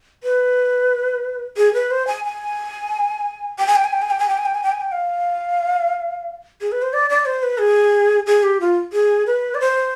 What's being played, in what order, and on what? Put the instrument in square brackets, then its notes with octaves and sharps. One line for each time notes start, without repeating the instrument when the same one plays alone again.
[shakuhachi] B4
G#4
B4
C5
G#5
G#5
G5
G#5
G5
G#5
G5
G#5
G5
G#5
G5
G#5
G5
G#5
G5
G#5
G5
F5
G#4
B4
C5
D5
D5
C5
B4
G#4
G#4
G4
F4
G#4
B4
D5
C5